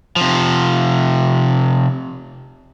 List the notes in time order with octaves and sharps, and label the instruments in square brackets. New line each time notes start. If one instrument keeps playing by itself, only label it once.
[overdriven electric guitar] C3 F3